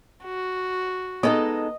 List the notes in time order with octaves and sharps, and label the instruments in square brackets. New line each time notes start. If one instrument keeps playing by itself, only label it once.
[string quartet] F#4
[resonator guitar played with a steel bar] G#3 A4 [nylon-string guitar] B3 D#4 [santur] D#5